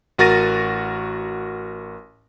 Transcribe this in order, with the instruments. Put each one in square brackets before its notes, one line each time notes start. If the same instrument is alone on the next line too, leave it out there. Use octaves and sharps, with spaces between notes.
[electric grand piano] A1 F#4 A#4 A6 A#6 D#7